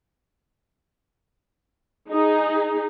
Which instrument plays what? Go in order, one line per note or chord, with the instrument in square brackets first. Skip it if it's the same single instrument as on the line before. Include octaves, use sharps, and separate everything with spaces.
[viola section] D#4 G#4